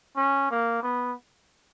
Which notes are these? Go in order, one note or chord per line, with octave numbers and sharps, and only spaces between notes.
C#4
A#3
B3